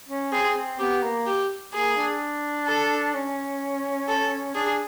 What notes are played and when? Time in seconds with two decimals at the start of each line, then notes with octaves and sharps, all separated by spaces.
0.09 C#4
0.32 C4 G#4
0.56 C4
0.79 B3 G4
1.03 A#3
1.26 G4
1.74 A#3 G#4
1.97 D4
2.67 A4
3.14 C#4
4.08 A4
4.55 D4 G#4